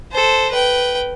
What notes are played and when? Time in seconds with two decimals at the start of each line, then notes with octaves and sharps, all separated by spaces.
0.12 A4 C5
0.51 B4 G5